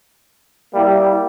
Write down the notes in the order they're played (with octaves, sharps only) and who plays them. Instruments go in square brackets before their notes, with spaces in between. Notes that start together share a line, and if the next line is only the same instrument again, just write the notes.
[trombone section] G3 A#3 E4 G4